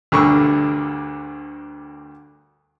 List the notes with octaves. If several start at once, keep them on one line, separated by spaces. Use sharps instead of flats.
D2 G2 D3 A#4 C#6 E6